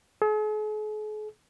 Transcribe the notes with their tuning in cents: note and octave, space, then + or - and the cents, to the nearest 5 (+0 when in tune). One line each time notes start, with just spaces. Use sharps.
G#4 +45